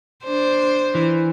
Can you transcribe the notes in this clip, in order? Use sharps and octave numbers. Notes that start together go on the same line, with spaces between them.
D4 C5
E3